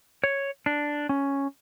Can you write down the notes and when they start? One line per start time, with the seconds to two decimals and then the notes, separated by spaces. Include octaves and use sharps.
0.24 C#5
0.66 D4
1.09 C#4